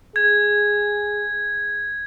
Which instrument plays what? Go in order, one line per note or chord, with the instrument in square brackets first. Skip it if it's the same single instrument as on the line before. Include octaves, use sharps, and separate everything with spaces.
[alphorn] G#4 [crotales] G#6